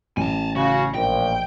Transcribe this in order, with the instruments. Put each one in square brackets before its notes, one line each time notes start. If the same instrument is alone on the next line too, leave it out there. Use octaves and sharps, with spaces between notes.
[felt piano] A1 [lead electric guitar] G#5 A5
[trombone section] C#3 [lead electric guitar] F#4
[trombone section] A#1 [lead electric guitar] G5